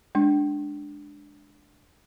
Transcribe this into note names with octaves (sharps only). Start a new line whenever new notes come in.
G#3 D4